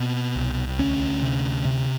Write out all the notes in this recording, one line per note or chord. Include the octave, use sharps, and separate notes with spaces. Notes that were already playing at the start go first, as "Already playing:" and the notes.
Already playing: B2 C4
C2
D2 C#4
C3
C3